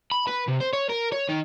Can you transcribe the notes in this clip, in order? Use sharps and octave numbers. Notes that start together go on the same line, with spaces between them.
B5
B4
C3
C5
C#5
A#4
C#5
D#3